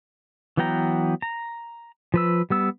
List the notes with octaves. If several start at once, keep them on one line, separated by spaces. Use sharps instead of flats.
E3 F#3 B3 G5 A#5
A#5
F3 B4 E6
G3 B3 E6